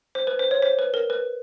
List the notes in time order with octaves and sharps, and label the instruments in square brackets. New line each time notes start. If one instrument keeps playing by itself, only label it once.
[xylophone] C5
B4
C5
C#5
C5
B4
A#4
B4